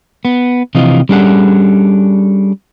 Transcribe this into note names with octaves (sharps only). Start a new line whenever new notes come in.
B3
C3 E3 F3 F4 D#5
G3 C#4 D4 G#4 A4 F#5